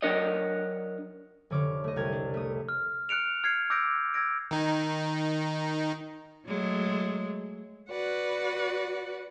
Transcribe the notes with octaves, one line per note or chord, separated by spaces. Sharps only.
F#3 D4 A#4 C#5 D#5
F1 D3 C#5 D6 F6
A3 D#5
C2 C4 F6 G#6
D4
A3 D#6
F6
F6 F#6 C#7 D7 F7
F6 G#6 C7 C#7
D6 E6 G6 A#6 C#7 D7
E6 G#6 A#6 D7
D#3 D#4
F#3 G#3 A3
F#4 B4 D5 F#5